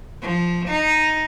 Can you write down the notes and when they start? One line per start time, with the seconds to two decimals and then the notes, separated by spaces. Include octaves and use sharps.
0.22 F3
0.68 D#4